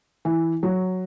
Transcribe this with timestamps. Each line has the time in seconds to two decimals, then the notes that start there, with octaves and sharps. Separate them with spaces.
0.25 E3
0.63 F#3